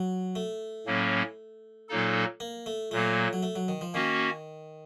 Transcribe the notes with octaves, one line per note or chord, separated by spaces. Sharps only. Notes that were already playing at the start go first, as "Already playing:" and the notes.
Already playing: F#3
A3
A2 F#3 A#3 C#4
A#2 F#3 A#3 D#4 A4
A#3
A3
A#2 F#3 A3 A#3
F#3
A3
F#3
D#3
F3
D#3 A#3 C#4 F#4